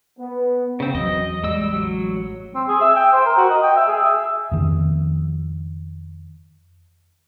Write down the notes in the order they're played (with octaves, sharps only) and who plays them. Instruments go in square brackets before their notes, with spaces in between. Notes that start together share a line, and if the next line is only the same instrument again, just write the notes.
[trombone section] B3
[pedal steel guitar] C#3 C4
[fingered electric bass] E2 F#3 [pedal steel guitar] D#5
[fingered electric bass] A1 G#3 [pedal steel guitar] G3 E6
[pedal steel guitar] F#3
[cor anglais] C4
G#4
E5
G5
C5
A#4
F#4
D#5
G5
E5
G#4
E5
[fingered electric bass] F2 D#3